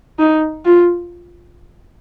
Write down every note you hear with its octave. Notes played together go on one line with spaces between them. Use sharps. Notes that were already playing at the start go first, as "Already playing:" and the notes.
D#4
F4